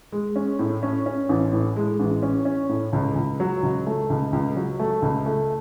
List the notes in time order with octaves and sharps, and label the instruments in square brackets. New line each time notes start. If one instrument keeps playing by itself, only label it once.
[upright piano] G#3
C#4
A2
C#4
C#4
A1
A2
G#3
A1
C#4
C#4
A2
C#2
C#2
F#3
C#2
A3
C#2
C#2
F#3
A3
C#2
A3